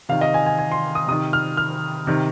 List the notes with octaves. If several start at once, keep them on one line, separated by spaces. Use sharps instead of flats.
C3 D#3 F5
D#5
G#5
G#5
G#5
C6
D#6
C3 D#3 D#6
F6
F6
C3 D#3